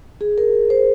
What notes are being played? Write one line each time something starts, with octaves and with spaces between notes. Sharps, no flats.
G#4
A#4
C5